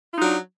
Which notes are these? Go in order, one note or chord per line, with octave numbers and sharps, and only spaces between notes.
F#3 D4 D#4 F4